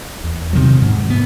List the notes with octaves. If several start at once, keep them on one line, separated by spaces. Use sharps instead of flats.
E2
C3 D#3 F#3
G#2
B3